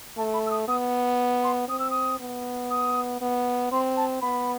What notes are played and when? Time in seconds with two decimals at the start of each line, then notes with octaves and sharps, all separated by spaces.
0.17 A3 A5
0.34 B5
0.46 E6
0.51 D#6
0.68 B3 D#6
1.44 C6
1.68 C4 D#6
1.79 E6
1.91 D#6
2.20 B3
2.70 D#6
3.21 B3
3.72 C4 C6
3.97 A5
4.21 B3 B5